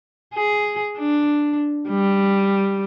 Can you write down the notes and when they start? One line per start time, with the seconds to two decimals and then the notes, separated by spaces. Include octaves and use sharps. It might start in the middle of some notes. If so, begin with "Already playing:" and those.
0.34 G#4
0.98 D4
1.89 G3